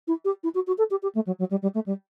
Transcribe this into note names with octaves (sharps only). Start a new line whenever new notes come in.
E4
G4
E4
F#4
F#4
A4
G4
G4
A3
F#3
F#3
G3
G3
A3
G3